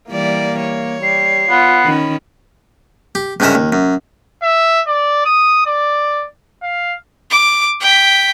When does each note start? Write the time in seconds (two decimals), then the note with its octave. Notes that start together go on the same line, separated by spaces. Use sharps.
0.10 E3 G3 A#3 D5
0.61 C#5
1.03 G3 C7
1.50 B3 F4
1.85 D#3 C#4 B5
3.15 G4
3.40 C#2 G2 C#3 G#3 A#4 E5
3.55 D#2
3.72 F#2
4.43 E5
4.87 D5
5.26 D#6
5.66 D5
6.63 F5
7.31 D6
7.82 G5 B6